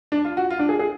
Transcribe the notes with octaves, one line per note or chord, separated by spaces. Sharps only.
D4
F4
F#4
F4
D4
G#4
G#4